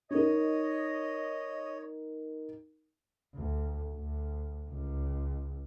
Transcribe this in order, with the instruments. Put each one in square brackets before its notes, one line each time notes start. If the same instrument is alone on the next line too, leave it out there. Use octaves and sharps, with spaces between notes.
[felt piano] D#4 A#4 [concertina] C#5 [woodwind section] D#5
[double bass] D2
D2
C#2